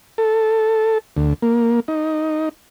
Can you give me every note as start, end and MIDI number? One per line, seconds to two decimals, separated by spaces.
0.18 0.98 69
1.17 1.34 38
1.42 1.80 58
1.88 2.49 63